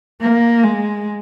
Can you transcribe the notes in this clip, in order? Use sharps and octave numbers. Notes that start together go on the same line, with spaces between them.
A#3
G#3